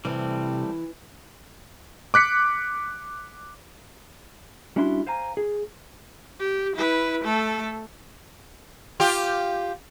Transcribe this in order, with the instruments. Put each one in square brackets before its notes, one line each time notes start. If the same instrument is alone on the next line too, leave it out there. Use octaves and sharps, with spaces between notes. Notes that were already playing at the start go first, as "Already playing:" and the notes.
[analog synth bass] C3 [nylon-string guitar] E3 [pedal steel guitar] G3 A3 C4
[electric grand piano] D6 F#6 B6 C#7
[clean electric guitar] G3 C#4 D4 E4 F#4 C6
C5 F5 G#5 A#5
G#4
[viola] G4
E4 B4
A3 A4
[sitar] F4 G4